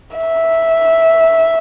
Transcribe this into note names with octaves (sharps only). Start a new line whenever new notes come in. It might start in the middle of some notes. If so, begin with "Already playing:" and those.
E5